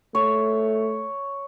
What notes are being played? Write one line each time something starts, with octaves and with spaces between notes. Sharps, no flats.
A3 C#5